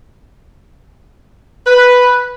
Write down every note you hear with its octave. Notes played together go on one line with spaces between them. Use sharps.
B4